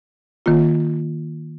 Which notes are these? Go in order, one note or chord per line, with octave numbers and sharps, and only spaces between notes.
D#3 A#3 F4